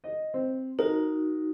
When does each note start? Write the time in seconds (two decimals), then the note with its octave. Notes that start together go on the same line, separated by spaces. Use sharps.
0.04 D#5
0.34 C4
0.79 D#4 F#4 A#4